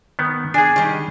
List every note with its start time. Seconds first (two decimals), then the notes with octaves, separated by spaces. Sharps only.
0.19 D#3 B3
0.54 D4 G#4 G#5
0.76 D#3 G3